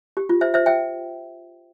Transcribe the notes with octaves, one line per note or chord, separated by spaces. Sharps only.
G4
F4
C5 E5
C5 E5
E5 G5